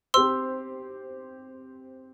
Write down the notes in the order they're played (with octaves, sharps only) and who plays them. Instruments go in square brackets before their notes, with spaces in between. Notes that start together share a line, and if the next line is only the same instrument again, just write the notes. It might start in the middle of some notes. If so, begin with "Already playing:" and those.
[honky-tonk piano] C4 G4 C5 [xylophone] C6 E6